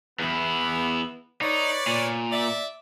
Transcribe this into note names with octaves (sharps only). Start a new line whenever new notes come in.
E2 B3 E4
D#4 B4 C#5 D5
A#2
D5 E5